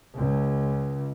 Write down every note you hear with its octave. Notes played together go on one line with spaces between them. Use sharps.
C#2